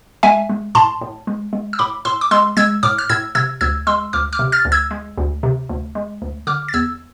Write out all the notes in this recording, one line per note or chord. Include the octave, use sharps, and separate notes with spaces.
G#3 E5 G#5
G#3
A2 A5 C6
A2
G#3
G#3
E6
A2 B5 D6
A2 C6 E6
D6
G#3 C6 E6
G#3 E6 G#6
A2 D6 F6
F6
A2 E6 G#6
C3 E6 G#6
D2 E6 G#6
G#3 C6 E6
D2 D6 F6
D6 F6
C3
F6 A6
D2
E6 G#6
G#3
D2
C3
D2
G#3
D2
D3 D6 F6
A6
E2 E6 G#6